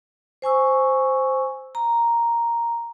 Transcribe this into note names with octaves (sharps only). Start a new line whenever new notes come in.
C5 G#5 C#6 E6
A#5